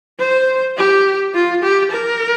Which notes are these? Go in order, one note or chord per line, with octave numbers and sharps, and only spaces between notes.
C5
G4
F4
G4
A#4